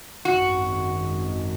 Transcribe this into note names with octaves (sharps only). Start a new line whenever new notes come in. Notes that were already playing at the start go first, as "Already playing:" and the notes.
G#1 F#2 D#3 G#3 F#4